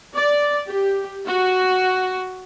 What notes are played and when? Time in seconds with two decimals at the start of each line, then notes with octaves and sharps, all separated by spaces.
0.15 D5
0.68 G4
1.25 F#4